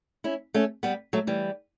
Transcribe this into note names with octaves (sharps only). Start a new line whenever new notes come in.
C#4 E4
A3 C#4
G3 B3
F#3 A3
E3 G3